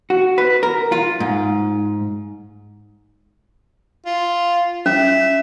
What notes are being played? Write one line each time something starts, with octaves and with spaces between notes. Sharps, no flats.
F#4
B4
A#4
F4
G#2
F4
C#4 E5